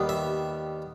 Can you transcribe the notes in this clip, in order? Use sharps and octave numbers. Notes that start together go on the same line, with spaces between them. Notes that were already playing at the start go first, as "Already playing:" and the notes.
Already playing: D#2 D#3 G3 B3
E5